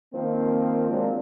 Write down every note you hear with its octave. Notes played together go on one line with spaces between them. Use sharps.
D#3 F3 A#3 C4
F3 F#3 G#3 A#3 C4 D4